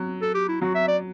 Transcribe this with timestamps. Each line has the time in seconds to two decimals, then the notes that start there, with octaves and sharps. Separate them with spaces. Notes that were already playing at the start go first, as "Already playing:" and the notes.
Already playing: F#3
0.22 A4
0.35 G4
0.48 E4
0.61 F#3 F#4
0.75 E5
0.87 D5